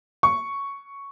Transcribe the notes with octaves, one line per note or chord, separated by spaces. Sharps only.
C#6